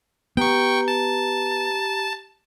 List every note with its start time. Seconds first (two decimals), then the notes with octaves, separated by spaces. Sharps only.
0.37 B3 G4 G5 A#5 C#6
0.88 A5